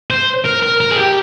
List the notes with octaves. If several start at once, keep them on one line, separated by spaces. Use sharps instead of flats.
C5
A#4
A#4
A#4
G#4
G4